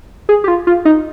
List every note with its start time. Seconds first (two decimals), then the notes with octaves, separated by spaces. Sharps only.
0.29 G#4
0.44 G4
0.48 F4
0.67 F4
0.85 D#4